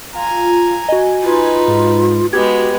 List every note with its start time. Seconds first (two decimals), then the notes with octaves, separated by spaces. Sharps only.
0.15 F4 G#5 A#5
0.89 F#4 D#5 G#5
1.23 D#4 F4 B4
1.68 G#2
2.33 G#3 B3 F#4 G4 G#6